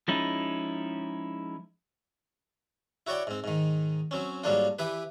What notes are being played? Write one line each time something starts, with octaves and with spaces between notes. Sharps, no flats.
F3 G#3 C#4 D#4 E4
E4 F#4 C#5 D5 G5
G#2 C4
G#2 D#3
F#3 C4 C#4
G#2 F#3 G3 A#3 D4 F4
E3 E4 G4 B4